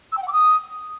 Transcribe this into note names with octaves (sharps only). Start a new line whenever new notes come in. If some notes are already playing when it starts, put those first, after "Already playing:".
E6
G5
F#5
D6
D#6